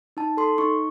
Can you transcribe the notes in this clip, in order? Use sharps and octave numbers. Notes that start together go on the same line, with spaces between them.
D#4 A5
A4 C6
D#4 C#6